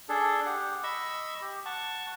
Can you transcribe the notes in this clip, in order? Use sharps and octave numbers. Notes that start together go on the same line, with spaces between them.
D4 G#4 A4
G4 F#5
D#5 B5 C#6 E6
G4
F#5 A5 C#6